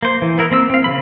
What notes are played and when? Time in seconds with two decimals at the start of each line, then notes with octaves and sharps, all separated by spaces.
0.03 A#3 C5
0.22 E3
0.38 B3 E4 A#4
0.51 A#3 C4 A#5 E6
0.70 C4 F5
0.84 C#3 G3 B5